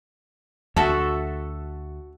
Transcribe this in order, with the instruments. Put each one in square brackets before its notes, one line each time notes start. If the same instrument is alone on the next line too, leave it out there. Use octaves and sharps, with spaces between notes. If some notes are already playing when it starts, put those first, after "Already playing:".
[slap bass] D2 [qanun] F#4 A4 E5 [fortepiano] A5